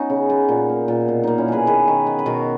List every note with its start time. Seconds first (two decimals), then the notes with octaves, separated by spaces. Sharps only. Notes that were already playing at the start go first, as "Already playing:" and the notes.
Already playing: B3 C#4 D#4 F#4
0.10 C#3
0.30 B3
0.48 A#2
0.69 A#3
0.88 A#2
1.08 B2
1.23 A#3 D#4
1.38 C#4 E4
1.48 B2 G#4 B4
1.67 D#3 G#4 B4
1.88 D#3
2.07 B3
2.19 B4
2.26 B2 F#4 A#4